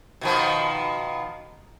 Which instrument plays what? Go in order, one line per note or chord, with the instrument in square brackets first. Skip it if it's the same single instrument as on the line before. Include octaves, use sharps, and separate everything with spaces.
[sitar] B2 D#3 F3